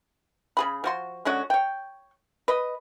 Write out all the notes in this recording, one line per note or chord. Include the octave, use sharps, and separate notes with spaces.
C#3 G#4 B5
F3 F#4 C6
D3 G#3 C#4 F#4
C#5 G5
B4 D#5